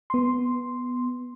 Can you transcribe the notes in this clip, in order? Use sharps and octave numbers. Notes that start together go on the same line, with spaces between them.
B3 C6